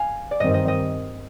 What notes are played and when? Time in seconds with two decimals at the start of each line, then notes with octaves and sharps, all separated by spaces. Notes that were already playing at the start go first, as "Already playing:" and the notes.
Already playing: F5 G#5
0.31 D5
0.40 G2 D#3 G3 C4 D#5
0.54 D#5
0.68 D#5